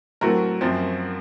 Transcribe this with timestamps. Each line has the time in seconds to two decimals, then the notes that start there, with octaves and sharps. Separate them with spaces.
0.21 A2 F#3 A3 C4 F#4 A#4
0.61 F#2 F3 C4